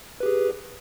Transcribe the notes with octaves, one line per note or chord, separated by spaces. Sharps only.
G4 G#4 B4